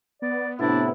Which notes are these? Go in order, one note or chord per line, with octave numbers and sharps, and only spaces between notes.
B3 D5
A2 C3 D4 E4